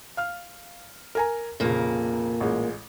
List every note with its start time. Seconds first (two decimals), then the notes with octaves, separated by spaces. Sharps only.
0.17 F5 F6
1.15 A#4 G#5 A#5
1.60 F1 A#2 C#3 A#3
2.40 A1 G#3